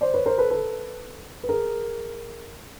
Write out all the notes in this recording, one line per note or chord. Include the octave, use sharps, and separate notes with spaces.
C5 D5
B4 C#5
A#4 C5
A4 B4
A4 B4
B4
G#4 A#4